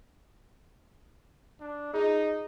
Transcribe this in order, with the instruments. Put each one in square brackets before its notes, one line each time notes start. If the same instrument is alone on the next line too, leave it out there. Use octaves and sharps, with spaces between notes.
[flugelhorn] D4
[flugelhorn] D#4 [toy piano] F4 G#4